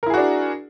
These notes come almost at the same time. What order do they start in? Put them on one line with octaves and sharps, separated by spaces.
A#4 E4 G#4 F#4 D4